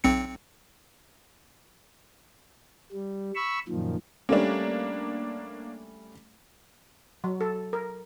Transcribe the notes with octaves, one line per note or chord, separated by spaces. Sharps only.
B1 C4 C#7
G3
B5 C#6 E6
F#2 A#2 D#3 F3
G3 A3 A#3 C#4 D4
F#3
A4
A#4